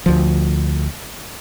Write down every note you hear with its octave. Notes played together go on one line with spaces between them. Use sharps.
D2 F3